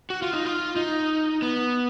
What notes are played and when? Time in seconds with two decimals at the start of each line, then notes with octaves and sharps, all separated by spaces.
0.10 F#4
0.22 F4
0.33 D#4
0.45 F4
0.76 D#4
1.42 B3